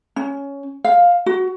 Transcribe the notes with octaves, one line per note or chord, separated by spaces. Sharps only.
C#4
F5
F#4